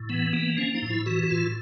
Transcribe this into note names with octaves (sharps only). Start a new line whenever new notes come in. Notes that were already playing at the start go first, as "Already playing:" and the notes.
Already playing: A2
E3 B3
A#3 B3
F3 C#4
D#4
A2
E4
E3 F#4
F#4
A2 F4